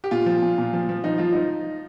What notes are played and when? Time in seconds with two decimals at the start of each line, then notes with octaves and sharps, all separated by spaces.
0.04 G4
0.11 A#2 F4
0.26 F3
0.42 A#2
0.58 A#2
0.73 F3
0.89 F3
1.04 F3 D#4
1.18 F3 F4
1.33 F3 D#4